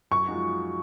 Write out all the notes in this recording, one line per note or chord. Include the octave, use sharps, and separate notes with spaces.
F#2 C#6
F3 G#3 D#4 F#4